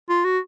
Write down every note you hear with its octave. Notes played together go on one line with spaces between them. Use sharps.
F4
F#4